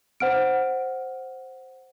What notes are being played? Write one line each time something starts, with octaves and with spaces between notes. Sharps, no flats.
C5 F#5 F6 D7